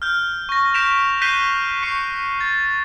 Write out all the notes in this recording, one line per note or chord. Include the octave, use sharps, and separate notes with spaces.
F6 G6
C#6 A#6
G6 B6 D7 E7 F7
F#6 G6 B6 C7 D#7 G7
C#6 C7 C#7
A6